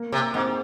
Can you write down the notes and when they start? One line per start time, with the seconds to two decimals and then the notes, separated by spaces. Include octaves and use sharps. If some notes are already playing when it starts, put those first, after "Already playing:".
Already playing: A#3
0.12 C3
0.34 G#2 C4